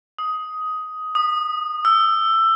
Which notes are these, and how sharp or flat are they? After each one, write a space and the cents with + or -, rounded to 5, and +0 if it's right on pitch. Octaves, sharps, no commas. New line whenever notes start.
D#6 +10
D#6 -20
E6 +15